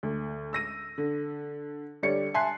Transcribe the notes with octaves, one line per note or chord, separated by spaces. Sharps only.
D2
E6 A#6 D#7
D3
D3 G3 C#5 D5 C#7
E5 G#5 A5 C6 F#6 C7